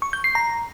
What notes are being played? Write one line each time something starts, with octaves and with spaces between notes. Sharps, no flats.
C#6
G6
C7
A#5